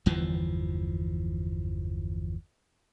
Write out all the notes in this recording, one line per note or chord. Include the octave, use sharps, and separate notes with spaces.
G1 E2 E3 F3